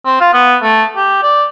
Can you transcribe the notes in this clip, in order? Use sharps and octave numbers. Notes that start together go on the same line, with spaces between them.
C4
F4
B3
A3
G4
D5